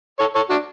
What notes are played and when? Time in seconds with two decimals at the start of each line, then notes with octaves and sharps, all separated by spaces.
0.19 A4 C#5
0.35 A4 C#5
0.50 D4 F#4